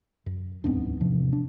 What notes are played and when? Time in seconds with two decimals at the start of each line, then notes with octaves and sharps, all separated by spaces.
0.26 F#2
0.64 D1 E2 G#2 B3 C4 D4
1.01 C3 F3
1.33 D4